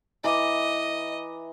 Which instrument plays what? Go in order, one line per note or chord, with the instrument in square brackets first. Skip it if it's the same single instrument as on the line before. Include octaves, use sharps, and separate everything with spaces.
[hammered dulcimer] E3 A#5 D6 [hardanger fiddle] D#5